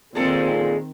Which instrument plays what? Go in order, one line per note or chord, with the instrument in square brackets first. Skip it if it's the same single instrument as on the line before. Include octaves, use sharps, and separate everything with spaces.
[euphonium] A#2 [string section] D#3 C4 [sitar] G#3 A4